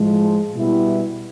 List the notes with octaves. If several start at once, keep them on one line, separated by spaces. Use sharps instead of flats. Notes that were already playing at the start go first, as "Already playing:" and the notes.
Already playing: A2 F3 G#3
B2 G3 B3 E4